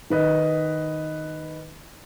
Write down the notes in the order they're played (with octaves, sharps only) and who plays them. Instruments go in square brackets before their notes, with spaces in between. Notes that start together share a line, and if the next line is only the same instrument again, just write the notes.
[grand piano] D#3 B4 D#5